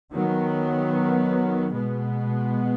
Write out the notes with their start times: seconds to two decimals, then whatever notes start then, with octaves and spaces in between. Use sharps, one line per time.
0.13 D#3 F#3 B3
1.71 B2 G#3 B3